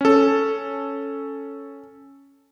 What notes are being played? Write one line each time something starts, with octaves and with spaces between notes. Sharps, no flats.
C#4 A4